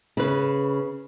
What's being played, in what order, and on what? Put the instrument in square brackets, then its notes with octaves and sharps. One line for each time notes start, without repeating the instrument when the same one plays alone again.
[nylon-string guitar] C#3 B4